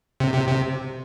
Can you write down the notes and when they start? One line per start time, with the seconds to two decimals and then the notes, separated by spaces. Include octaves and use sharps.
0.20 C3
0.34 C3
0.48 C3